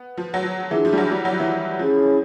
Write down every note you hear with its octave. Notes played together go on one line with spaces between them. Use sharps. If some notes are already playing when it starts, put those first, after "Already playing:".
Already playing: B3
F3
F#3
F3
E3 D4 F4 G#4
F3
G3
F#3
G3
F#3
F3
E3
F3
F3 C#4 E4 G#4 C#5